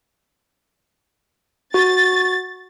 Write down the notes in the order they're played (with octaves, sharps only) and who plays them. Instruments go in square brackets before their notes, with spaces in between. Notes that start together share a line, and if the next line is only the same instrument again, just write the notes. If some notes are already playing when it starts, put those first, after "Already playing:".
[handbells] F#4 [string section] A6